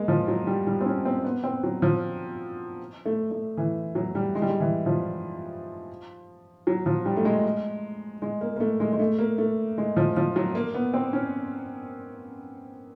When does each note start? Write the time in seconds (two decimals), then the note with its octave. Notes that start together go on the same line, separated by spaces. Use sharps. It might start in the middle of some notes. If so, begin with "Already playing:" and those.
Already playing: G#3 A#3
0.08 F3
0.28 F#3
0.47 G3
0.67 G3
0.81 C4
0.86 C#4
1.05 C4
1.24 B3
1.44 C4
1.63 F#3
1.82 F3
3.05 A3
3.31 A3
3.57 E3
3.95 F#3
4.15 G3
4.35 G#3
4.42 G3
4.49 G#3
4.60 E3
4.86 F3
6.67 F#3
6.86 F3
7.06 G3
7.17 A3
7.25 G#3
8.22 G#3
8.41 A#3
8.56 A#3
8.60 A3
8.80 G#3
8.93 G#3
8.99 A3
9.18 A#3
9.38 A3
9.78 G#3
9.96 F3
10.17 F3
10.36 F#3
10.55 A#3
10.74 B3
10.94 C4
11.13 C#4